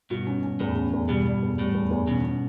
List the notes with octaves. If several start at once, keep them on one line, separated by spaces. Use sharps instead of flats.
G2 B2 F#4
C#4
C#4
E2 A2
C#4
E2
G2 B2 G3
G3
E2
A2 G3
E2
E2
G2 B2 C#4
C#4